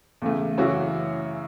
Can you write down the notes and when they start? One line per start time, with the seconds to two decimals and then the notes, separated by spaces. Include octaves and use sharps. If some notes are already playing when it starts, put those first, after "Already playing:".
0.22 E2 C#3 A3
0.57 F#2 C#3 E3 C#4 F#4